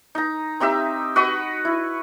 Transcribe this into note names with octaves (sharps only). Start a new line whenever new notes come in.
D#4 A#5
C4 D#4 G4 E5
F#4 B4 D#5 C#6
E4